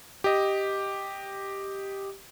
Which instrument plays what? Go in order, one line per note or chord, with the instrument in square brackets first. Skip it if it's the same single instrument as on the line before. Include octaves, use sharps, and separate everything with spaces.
[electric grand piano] G4 D#5